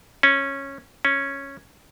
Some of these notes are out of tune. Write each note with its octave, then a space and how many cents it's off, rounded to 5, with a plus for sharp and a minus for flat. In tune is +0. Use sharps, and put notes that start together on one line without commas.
C#4 -10
C#4 -5